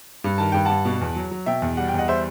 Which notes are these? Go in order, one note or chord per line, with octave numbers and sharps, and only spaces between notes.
G2
D#3 A5
G2 G5
G2 F#5 A5
B2
E2
F#3
F#3
B2 E5 G5
E2
G3 F#5
G5
E2 D#5 F#5
G3 C5 E5